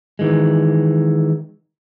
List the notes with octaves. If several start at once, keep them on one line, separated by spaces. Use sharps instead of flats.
D#3 E3 G#3